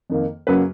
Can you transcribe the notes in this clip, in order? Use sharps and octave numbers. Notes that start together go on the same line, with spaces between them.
F2 D#3 A#3
F#2 C#3 F#3 A#3 B4